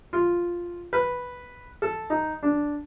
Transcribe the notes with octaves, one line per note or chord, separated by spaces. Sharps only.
F4
B4
A4
D#4
D4